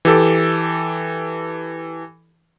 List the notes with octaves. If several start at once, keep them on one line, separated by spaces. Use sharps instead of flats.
E3 G4 A4